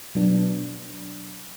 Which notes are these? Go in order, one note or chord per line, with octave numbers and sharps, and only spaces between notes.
B2 F#3 B3 D4